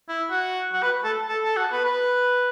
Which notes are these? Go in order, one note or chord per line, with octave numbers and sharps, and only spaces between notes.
E4
F#4
F#4
B4
A4
A4
A4
F#4
B4
B4